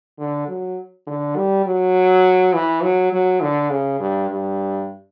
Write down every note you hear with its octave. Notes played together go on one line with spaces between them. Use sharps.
D3
F#3
D3
G3
F#3
E3
F#3
F#3
D3
C#3
G2
G2